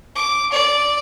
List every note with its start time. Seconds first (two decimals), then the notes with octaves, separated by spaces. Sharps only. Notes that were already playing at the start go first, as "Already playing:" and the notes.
0.16 D6
0.52 D5